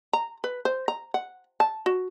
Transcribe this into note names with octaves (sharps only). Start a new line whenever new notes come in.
A#5
B4
C5
A#5
F#5
A5
F#4